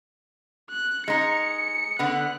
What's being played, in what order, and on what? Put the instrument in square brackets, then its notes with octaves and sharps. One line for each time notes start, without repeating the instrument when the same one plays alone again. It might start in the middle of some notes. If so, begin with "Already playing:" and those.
[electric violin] F#6
[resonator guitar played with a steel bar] G#3 D#4 [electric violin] C#7
[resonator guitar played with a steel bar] D3 B3 [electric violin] F#6